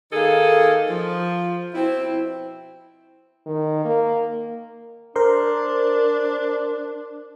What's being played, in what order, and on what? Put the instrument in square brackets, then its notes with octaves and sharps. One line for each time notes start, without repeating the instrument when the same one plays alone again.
[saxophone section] D#3 A#3 D#4 G#4 A4
F3
B2 C4 E4
[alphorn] D#3
A#3
[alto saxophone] D4 [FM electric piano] A#4 C5 C6